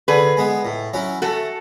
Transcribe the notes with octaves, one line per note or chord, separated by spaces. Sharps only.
D3 G#4 B4
G#3 B3
A2
F#3 C#4 E4
A3 F#4 A4